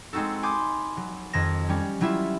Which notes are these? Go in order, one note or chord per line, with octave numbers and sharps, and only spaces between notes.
G#3 C4 D#4 F#4 A4
G#5 B5 C6 D6 D#6 G6
F#3
F2 D#3 A#6 E7
G3 C#4
F#3 G3 E4 F4 E5